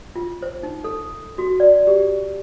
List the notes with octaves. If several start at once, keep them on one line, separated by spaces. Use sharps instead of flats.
F4
C5
D#4
A4
F#4
D5
G4